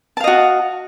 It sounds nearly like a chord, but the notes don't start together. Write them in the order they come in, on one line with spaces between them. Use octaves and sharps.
A5 F5 D#5 F#4